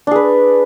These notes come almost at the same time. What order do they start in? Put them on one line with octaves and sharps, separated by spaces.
D4 G#4 B4